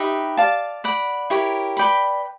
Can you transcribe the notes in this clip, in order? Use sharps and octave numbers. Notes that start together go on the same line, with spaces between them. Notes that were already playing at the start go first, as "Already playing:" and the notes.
Already playing: D#4 G4 B4 E5
D5 F5 A5
D5 F#5 B5
E4 G4 A#4 C#5
B4 D5 G5 B5